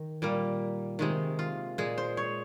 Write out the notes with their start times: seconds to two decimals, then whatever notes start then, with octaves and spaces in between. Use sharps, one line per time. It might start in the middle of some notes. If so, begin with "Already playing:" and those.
Already playing: D#3
0.22 A#2 G3 A#3
0.99 C3 D#3 G#3 G#4
1.39 F4
1.78 A#2 G#3 G#4
1.98 C5
2.17 C#5